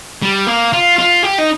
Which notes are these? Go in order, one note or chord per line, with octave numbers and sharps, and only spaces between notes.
G3
A#3
F4
F4
G4
D#4